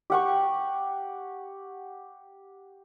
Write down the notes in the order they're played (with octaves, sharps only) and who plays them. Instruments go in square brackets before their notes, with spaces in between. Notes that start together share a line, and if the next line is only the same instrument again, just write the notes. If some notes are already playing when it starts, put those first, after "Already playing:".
[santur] G4 F#5 C#6